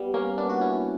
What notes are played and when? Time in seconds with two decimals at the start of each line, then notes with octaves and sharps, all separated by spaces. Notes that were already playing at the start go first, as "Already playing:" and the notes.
Already playing: G3 B3
0.14 A#3 C#4
0.38 B3 D4
0.50 F#4
0.61 C#4 E4